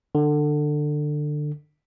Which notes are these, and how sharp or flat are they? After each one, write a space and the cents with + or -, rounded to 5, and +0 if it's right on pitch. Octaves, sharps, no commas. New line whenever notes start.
D3 +20